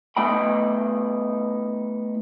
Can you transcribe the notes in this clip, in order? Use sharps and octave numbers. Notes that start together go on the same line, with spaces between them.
A3 B3 D#4 D#5 G5 B5